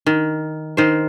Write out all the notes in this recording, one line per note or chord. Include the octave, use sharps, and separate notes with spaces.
D#3
D#3 C5